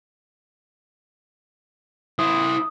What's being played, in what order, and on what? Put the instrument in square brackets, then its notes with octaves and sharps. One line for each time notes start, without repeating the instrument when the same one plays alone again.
[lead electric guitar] E4 C5 [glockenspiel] D#6